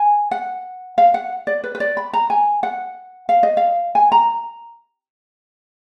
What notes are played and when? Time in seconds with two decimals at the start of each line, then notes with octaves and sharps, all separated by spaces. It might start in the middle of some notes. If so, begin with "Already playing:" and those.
Already playing: G#5
0.31 F#5
0.98 F5
1.14 F#5
1.47 D5
1.64 B4
1.75 B4
1.80 D5
1.97 B5
2.13 A#5
2.30 G#5
2.63 F#5
3.29 F5
3.43 D#5
3.57 F5
3.95 G#5
4.12 A#5